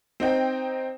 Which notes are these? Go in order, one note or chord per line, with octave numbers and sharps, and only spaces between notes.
C4 D#4 G5